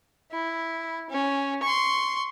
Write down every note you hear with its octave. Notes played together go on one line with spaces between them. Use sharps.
E4
C#4
C6 C#6